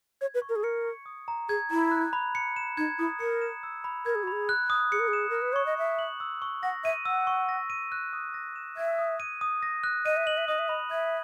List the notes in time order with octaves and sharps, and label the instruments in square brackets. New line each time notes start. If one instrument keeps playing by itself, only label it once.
[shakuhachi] C#5 [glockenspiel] G#6
[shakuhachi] B4
[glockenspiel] C#6
[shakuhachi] A#4
G#4
[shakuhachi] A#4 [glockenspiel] C#7
[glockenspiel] C#6
D#6
A#5
[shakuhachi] G#4 [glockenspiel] G#6
[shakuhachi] E4 [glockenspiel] A#5
[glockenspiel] F#6
B5
C#7
E7
[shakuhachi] D#4 [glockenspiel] G#6
[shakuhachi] E4 [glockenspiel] D#6
[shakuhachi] A#4 [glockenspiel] C#7
[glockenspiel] E7
E6
B5
[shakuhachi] A#4 [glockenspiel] G#6
[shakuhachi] G#4
F#4
[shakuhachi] G#4 [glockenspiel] B5
[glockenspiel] F#6
D#6
[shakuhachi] G#4 [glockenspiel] C#7
[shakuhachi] A#4
G#4
[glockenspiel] E7
[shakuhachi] A#4 [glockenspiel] F#6
[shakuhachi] B4
[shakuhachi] C#5 [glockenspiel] C#6
[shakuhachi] D#5
[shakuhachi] E5 [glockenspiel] C#7
[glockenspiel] F#7
E6
C#6
[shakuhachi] F#5 [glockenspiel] A#6
[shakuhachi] E5 [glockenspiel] D#7
[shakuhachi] F#5 [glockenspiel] E6
[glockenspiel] C#6
A#6
D#7
F#6
D#6
A#6
E7
[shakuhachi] E5 [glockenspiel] G#6
[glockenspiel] D#6
D#7
D#6
A#6
F#6
[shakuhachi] D#5 [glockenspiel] D#7
[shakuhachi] E5
[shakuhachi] D#5 [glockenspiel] F#7
[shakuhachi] E5
[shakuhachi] D#5 [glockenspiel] D#6
[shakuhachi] E5
[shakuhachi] D#5 [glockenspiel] B5
[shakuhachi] E5 [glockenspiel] G#6